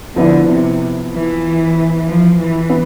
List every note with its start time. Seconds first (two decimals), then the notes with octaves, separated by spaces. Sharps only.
0.16 D3 F3 B3 E4
0.48 C3
1.12 E3
2.06 F3
2.39 E3
2.70 B3